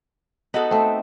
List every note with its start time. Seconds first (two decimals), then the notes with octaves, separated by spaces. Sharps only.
0.54 B3 D#4 F#4 A4
0.71 A3 C4